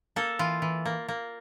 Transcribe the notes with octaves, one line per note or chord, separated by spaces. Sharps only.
A#3 A4
E3 F4
E3
A#3
A#3